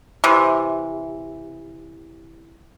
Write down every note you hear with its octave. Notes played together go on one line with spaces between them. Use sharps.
C3 E3